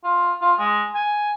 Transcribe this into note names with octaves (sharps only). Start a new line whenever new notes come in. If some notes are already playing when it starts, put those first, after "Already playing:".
F4
F4
G#3
G#5